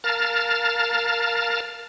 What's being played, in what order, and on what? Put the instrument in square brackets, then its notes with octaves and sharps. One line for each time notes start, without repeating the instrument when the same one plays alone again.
[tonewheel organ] A#4 F5 A5 A#5 F6 A6